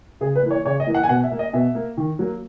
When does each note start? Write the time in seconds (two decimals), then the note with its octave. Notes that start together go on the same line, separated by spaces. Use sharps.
0.21 C#3 G#4
0.36 B4
0.43 E3 A#3
0.51 C#5
0.65 C#3 C#5
0.80 D#5
0.87 E3 A#3
0.94 F#5
1.03 G#5
1.09 B2 F#5
1.24 E5
1.32 A#3
1.39 D#5
1.53 B2 E5
1.75 A#3
1.97 D#3
2.19 F#3 A#3